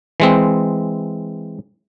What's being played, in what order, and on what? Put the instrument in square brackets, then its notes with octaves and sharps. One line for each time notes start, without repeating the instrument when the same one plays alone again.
[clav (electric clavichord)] E3 G#3 C4